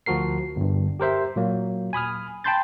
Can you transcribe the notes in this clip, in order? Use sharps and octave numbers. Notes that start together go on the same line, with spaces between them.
D2 F3 F#4 A#4 C7
G1 G2
G4 A#4 C5 E5
A#2 F#3 A#3
G#5 B5 D#6 F6
G5 A5 B5 C6 G6 A6